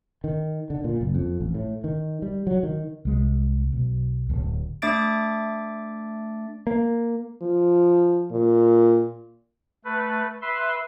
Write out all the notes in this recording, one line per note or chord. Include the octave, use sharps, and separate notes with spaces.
D#3
D3
A#2
F#1
F2
A1
A2
D#3
G3
F#3
D#3
C2 G#3
B1
D1
A3 D4 E5 D6 A6 D7
A#3
F3
A#2
A3 B4
B4 E5 C6